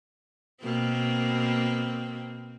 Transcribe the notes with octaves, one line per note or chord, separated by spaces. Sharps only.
B2 A#3 C4